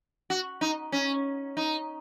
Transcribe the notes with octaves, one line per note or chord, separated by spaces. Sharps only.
F#4
D#4
C#4
D#4